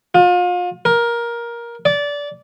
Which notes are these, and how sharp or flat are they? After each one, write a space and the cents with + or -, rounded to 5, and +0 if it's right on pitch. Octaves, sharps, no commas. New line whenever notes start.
F4 +35
A#4 +15
D5 -20